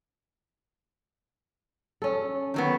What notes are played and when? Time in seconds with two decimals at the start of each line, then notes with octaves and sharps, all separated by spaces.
2.02 C#4 A4
2.54 D#3 F#3 B3